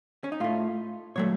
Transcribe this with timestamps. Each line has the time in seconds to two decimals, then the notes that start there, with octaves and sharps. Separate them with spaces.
0.24 C#4
0.32 D#4
0.40 A2 A3 F4
1.16 A#2 F#3 A3 C#5